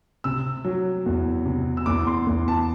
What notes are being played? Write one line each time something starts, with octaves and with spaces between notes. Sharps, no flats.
C3 E6
F#3
E2
C3
E6
E2 D6
C6
E2
A5